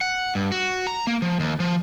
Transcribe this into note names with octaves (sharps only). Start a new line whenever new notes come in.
F#5
G2
F#4
A#5
A#3
F3
D#2
F3